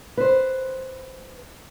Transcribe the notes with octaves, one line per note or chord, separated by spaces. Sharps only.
B4 C5